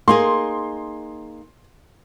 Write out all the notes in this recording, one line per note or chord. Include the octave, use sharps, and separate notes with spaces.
A#3 D#4 G#4 C6